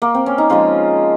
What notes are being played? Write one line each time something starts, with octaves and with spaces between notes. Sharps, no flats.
A#3
C4
C#4
D#4
C#3 F3 G#3 F4